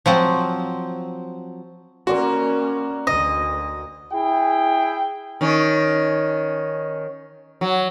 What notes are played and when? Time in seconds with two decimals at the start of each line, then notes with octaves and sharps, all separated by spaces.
0.06 F3 F#3 C4
2.07 A#3 C#4 F#4 A#4 D5 C6
3.07 D2 D#5
4.12 E4 G#4 G5
5.41 D#3 C#4
7.61 F#3